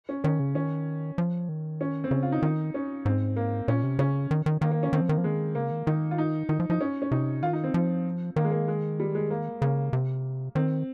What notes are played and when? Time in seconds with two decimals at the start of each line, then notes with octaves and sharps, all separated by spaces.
0.09 C#4
0.24 D#3 C#4
0.40 C#3
0.55 D#3 C#4
1.18 F3
1.49 D#3
1.81 C#4
2.04 C4
2.11 C#3 C#4
2.23 F4
2.32 D#4
2.42 D#3 D#4
2.74 C#4
3.05 G#2 C4
3.36 A#3
3.68 A#2 C#4
3.84 C3
3.99 C#3 C#4
4.31 D#3
4.46 D#3
4.61 D#3 A#3
4.71 A#3
4.83 C#4
4.93 D#3 C4
5.01 F3
5.08 D#3 A#3
5.18 F3
5.24 D#3 G#3
5.55 C#3 A#3
5.71 D#3
5.87 D#3 D#4
6.11 F4
6.18 D#4
6.49 D#3 D#4
6.60 F3
6.70 F3 D#4
6.81 C#4
7.02 C#4
7.11 C3 D#4
7.42 D#3 F4
7.53 D#4
7.64 C4
7.74 F3
8.36 D#3 A#3
8.44 G#3
8.51 A#3
8.68 G#3
9.00 G3
9.15 G#3
9.30 A#3
9.61 C#3 A#3
9.93 C3
10.55 D#3 C4